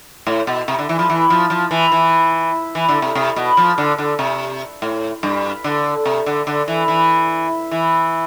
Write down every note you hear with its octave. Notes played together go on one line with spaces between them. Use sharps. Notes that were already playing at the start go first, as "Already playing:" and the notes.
A2
B2
C3
D3
E3
F3
E3
F3
F3
E3
E3
E3
D3
C3
C3
B2
F3
D3
D3
C3
A2
G2
D3
C3
D3
D3
E3
E3
E3